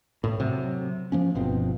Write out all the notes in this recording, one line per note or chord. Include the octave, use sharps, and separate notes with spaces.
A2
C3 F#3
F3 A#3 C#4
G1 B2 F3 C4